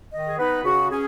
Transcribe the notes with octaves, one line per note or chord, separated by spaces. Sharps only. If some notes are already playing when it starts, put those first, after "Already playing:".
D#3 D#5
G#4
B3 D#4 B4
C#3 F#4
C#4 G#4